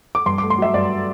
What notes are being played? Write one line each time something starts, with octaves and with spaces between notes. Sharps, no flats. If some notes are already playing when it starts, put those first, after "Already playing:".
D6
G2 C6
D6
A3
C6
F#3 E5
G2 D5